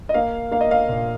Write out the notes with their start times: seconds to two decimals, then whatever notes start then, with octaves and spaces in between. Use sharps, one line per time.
0.09 D#5
0.14 A#3 F5
0.51 A#3 F5
0.61 D#5
0.71 F5
0.89 A#2